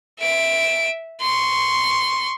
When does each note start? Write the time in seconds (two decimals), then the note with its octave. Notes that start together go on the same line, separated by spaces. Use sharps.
0.20 E5 D7
1.21 C6 C#6